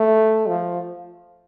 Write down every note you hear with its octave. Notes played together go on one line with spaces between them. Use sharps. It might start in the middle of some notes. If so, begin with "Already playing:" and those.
Already playing: A3
F3